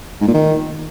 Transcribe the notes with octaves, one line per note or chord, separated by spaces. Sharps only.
G#2
A#2
D#3